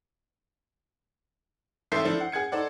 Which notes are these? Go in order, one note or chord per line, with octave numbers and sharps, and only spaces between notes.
A1 A4 E5 C6 G6 C7
F3 D4 E4 A4 C5
F#5
G#4 F#5 G#6 C#7
D#4 A4 C5 D5 F#5